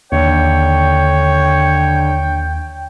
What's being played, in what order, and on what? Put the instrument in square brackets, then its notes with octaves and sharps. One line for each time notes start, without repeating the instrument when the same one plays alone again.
[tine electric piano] D#2 [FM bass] D3 [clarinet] C#5 [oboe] G5